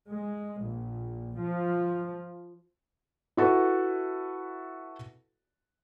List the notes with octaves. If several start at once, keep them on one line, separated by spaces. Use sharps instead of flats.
G#3
A#1
F3
E4 F#4 A4 B4